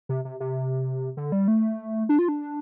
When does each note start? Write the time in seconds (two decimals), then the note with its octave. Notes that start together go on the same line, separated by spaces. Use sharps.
0.09 C3
0.25 C3
0.40 C3
1.17 D3
1.32 G3
1.48 A3
2.09 D4
2.19 F4
2.28 D4